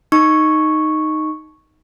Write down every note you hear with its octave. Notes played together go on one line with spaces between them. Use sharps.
D#4 C#6